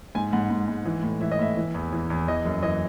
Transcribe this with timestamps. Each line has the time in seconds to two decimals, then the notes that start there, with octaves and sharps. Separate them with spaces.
0.15 G#2 G#5
0.32 G#2 F#5
0.50 G#2
0.68 G#2
0.86 E3
1.03 A2
1.21 E3 E5
1.31 D#5
1.39 A2 E5
1.57 E3
1.74 E2
1.93 E3
2.10 E2
2.28 E3 D#5
2.45 F#2
2.63 E3 D#5